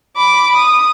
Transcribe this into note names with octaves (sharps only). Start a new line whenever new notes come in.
B5 D6
D#6